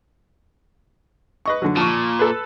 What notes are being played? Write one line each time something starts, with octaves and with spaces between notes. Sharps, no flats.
B4 D#5 C#6
D3 F#3
A#2 F3 C#6
A4 B4